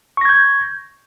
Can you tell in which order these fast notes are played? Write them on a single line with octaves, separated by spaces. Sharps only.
C#6 A#6 G#6 G6